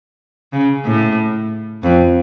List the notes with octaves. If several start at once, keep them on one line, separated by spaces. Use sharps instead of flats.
C#3
A2
F2